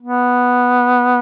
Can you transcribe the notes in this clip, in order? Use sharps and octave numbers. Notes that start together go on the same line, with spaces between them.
B3